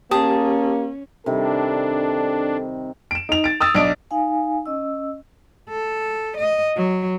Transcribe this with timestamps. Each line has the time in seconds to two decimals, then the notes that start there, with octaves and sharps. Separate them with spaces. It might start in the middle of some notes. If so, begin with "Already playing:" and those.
0.11 A#3 C#4 G4 G#4 A5 D#6
1.26 C3 D#3 G3 D4 A4
3.11 D7 E7
3.29 D#4 F7
3.44 A6 D7
3.61 D#6 E6 A6
3.75 B1 D4 D7
4.11 D#4 F5 G#5
4.66 C#4 D#5 E6
5.69 A4
6.37 D#5
6.76 F#3